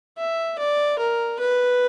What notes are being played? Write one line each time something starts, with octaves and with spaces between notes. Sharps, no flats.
E5
D5
A#4
B4